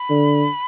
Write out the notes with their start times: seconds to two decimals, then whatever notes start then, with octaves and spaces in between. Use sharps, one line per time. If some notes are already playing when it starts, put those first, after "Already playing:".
Already playing: B5
0.10 D3